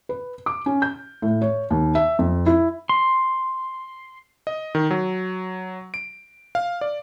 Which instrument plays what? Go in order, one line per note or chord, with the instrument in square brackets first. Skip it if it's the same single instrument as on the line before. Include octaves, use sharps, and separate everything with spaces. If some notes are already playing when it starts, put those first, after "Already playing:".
[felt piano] B4
D6
C#4
G6
A2
C#5
D#2
E5
F2
E4
[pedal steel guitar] C6
[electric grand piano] D#5
D#3
F#3
D7
F5
D5